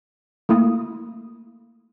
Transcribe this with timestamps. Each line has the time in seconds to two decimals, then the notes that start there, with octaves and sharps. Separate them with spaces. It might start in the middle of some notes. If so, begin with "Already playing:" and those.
0.49 A3 A#3 E4 D#6